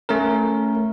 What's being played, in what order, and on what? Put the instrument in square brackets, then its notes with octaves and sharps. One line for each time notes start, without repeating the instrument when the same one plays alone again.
[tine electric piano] A3 C#4 A#4